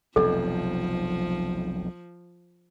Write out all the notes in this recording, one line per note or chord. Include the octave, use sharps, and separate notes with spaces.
F1 B1 F2 F3 A4